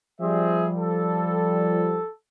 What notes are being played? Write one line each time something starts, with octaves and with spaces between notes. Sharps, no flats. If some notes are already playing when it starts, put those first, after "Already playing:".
F3 G3 C4 G#4 E5
A4